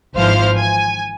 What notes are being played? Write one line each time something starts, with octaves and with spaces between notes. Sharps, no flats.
G#1 E3 F3 C5 F5 F6
G#5